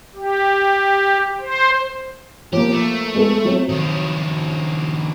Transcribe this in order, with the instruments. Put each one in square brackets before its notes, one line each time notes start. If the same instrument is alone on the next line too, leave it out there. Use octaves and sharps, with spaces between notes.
[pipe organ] G4
C5
[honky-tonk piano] F3 A#3 [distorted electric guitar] G4
[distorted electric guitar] A3
[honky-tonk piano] G#3 B3 A4
F#3 C4
[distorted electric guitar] D#3 F3